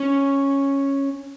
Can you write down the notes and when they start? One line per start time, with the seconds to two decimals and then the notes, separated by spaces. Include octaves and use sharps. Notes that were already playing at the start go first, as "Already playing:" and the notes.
Already playing: C#4